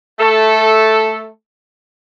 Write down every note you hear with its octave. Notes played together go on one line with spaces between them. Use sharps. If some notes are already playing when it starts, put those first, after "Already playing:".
A3 A4